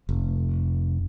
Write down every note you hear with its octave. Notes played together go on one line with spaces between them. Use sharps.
F1